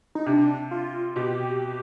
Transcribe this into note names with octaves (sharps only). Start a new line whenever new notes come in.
D#4
C3 D4
F4
B2 G4